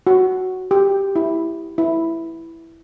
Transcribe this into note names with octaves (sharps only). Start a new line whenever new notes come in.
F#4
G4
E4
E4